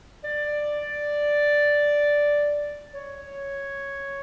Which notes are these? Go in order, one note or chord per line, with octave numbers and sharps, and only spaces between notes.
D5
C#5